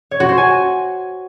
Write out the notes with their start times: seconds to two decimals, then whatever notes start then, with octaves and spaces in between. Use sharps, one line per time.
0.11 C#5
0.20 F#4
0.29 C5
0.38 G#5